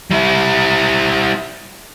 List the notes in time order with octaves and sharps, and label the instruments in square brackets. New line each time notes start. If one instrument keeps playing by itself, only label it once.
[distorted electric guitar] G3 E4